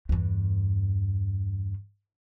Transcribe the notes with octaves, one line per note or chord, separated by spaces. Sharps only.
E2 G2